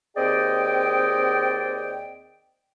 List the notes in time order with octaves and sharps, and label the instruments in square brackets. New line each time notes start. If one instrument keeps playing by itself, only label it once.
[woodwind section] D#2 C4 G#4 D5 D#5 G5